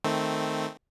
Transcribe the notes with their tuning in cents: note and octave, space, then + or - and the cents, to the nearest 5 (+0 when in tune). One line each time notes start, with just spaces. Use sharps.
D#3 +0 A3 +0 C4 +0